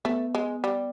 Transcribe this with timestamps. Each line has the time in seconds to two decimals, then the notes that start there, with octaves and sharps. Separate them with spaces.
0.05 A3 B3
0.35 G#3
0.64 G3